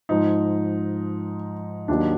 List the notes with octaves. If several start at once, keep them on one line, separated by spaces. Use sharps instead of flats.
G#2 F3 D#4
D#2 D#3 F#3 D4